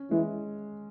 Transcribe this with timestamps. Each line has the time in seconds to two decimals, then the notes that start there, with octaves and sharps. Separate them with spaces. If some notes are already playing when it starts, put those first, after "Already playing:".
Already playing: C#4
0.11 E3 G#3